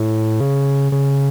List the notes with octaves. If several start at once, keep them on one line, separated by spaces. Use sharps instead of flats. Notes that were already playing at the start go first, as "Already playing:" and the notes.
Already playing: A2
C#3
C#3